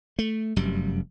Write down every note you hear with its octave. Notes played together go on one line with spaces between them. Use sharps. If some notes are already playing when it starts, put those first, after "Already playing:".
A3
F1 F#2 G3